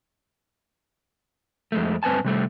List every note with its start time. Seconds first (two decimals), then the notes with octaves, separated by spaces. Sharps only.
1.72 F2 G#3 A3
2.03 G2 C4 B4 G#5 A5
2.25 C3 G3 A3